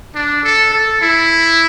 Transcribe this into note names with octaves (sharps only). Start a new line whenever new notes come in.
D4
A4
A4
E4